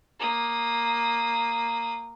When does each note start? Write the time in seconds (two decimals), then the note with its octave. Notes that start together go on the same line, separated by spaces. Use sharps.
0.20 A#3 D#6